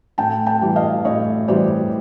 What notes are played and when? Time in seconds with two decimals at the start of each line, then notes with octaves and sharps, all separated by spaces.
0.18 A2 G5 A5
0.47 G5 A5
0.62 E3 G3
0.76 D#5 F5
1.05 A2 C#5 D#5
1.48 E3 G3 C5 D5